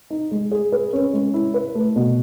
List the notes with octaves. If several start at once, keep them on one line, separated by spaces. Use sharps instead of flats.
D#4
G#3
G#4
B4
C#4
G#3
E4
B4
A3
B2